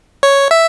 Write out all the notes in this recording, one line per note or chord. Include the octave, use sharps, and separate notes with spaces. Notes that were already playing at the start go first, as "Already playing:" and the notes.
C#5
E5